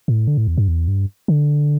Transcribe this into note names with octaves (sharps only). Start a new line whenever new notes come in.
A2
D3
A2
E2
G2
E2
G2
D3